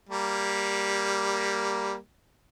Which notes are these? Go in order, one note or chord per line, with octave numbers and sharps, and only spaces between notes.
G3 A#3